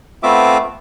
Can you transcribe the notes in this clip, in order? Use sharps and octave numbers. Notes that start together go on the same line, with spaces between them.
A3 B3 C4 F4 E5 D6